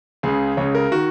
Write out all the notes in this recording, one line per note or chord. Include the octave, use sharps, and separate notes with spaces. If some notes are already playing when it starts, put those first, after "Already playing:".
C#2 C#3 G#4
C#2 C#3 C#5
A#4
D#3 F#4